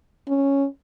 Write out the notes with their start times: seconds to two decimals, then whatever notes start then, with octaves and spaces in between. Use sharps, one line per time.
0.28 C#4